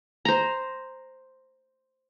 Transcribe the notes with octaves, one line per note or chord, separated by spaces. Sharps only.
C5 A#5